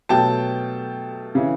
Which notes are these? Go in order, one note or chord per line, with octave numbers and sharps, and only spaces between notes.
B2 F#3 A3 G5 A5
C#3 E3